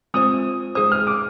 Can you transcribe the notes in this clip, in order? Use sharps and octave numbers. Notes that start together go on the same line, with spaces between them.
G#3 C4 F4 C5 D#6
G#3 D#4 G#4 C5 D#6
F6
D6